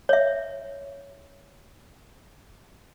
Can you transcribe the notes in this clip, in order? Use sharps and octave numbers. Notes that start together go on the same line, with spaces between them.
C#5 E5